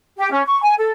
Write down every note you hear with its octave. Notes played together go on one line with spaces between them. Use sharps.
G4
C#4
C#6
G#5
A4